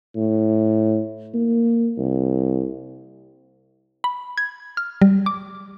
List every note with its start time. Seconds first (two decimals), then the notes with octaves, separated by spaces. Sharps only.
0.16 A2
1.34 A#3
1.98 C2
4.04 B5
4.38 G#6
4.77 F6
5.02 G3
5.26 D6